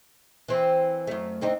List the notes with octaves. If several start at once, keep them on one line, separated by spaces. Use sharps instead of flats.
E3 C4
F#2 A3
D3 C4 D#4